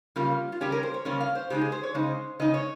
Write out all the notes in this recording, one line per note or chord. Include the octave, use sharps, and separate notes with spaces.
C#3 G3 A#3 C#4 F4
F4
C#3 G3 A#3 C#4 G4
A#4
C5
C#5
C#3 G3 A#3 C#4 C#5
F5
C5
C#3 G#3 D#4 G4
G#4
C5
C#5
C#3 G#3 D#4 C5
C#3 G#3 D#4 D#5
C#5